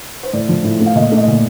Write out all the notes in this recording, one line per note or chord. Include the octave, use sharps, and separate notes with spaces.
C5
A2 D5
F3
A2
A3
F5
A#2 D#5
A3
D#5
A#2